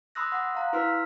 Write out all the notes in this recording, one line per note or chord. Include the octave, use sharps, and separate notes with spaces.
B5 C6 D#6 E6 F#6 A#6
F#5 C6 D#6
F5 A#5 F#6
E4 B4 C6 E6 F6 B6